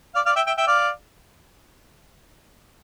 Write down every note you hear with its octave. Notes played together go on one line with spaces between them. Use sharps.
D5 F5
D5 F5
E5 G5
E5 G5
E5 G5
D5 F5